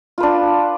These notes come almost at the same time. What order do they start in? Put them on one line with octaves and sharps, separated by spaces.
F4 B4 D4